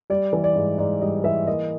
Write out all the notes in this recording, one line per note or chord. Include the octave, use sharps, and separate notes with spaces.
G3 D5
E3
D5
G#2
G#2 D5
G3 D#5
E3 E5
A#3 D#5